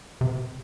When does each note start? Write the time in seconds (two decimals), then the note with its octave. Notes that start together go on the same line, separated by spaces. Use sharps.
0.21 C3